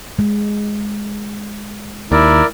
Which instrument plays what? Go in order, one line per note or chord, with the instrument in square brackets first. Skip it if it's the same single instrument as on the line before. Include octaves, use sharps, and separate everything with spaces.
[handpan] G#3
[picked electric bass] D#2 [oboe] E4 [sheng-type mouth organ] A#4 D5